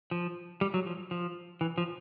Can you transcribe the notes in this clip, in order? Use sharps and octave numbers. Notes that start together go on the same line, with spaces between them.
F3
G3
F#3
F3
F3
E3
F3